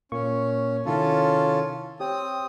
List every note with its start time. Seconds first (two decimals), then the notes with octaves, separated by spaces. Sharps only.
0.12 A#2 A#3 C#4 C#6
0.86 C3 D#3 C#4 E4 F4 A4
2.00 C4 G4 C#5 G5 D#6